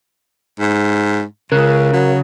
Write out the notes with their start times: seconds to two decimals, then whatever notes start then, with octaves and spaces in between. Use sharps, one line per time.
0.60 G#2
1.52 C#2 C#3 A#4 F#6
1.93 F#3